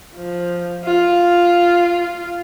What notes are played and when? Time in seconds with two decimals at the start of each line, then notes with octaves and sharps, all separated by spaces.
0.15 F3
0.86 F4